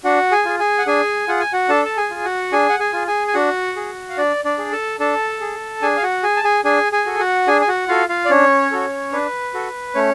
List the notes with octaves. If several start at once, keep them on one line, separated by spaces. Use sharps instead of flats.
D4 F#4 F#5
G#4 G#5
F4 G#4
G#4 G#5
F#5
D4 G#4 G#5
F4 G#4 F#5
G#5
F#4 F#5
D4 A4 A5
A5
G#4 G#5
F4 G#4
F#4 F#5
D4 G#4 G#5
F#5
G#4 G#5
F4 G#4
G#4 G#5
G#5
D4 F#4 F#5
G#4
F5
D4 D5
D4 D5
G#4
A4 A5
D4 A4 A5
G#4
D4 G#4 G#5
F5
F#4 F#5
G#4 G#5
A5
G#4 G#5
D4 G#4 G#5
G#4 G#5
F#4 A4
F#4 F#5
D4 G#4 G#5
G#5
F#4 F#5
F4 F#4 A4 F5
F4 F5
D5
C#4 D4 C#5
F#4 A4
D4 B4
F#4 A4
A3 C#4 C#5